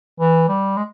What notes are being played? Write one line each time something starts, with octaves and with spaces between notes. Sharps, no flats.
E3
G3
G#3